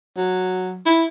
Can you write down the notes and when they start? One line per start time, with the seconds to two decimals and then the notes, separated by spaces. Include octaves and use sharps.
0.17 F#3
0.86 E4